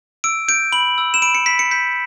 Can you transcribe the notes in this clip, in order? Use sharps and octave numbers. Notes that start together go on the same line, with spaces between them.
E6 D7
G6 D7
B5 F#7
E6
E7
B5 D7
C#7
B5 B6
C#7
G6 B6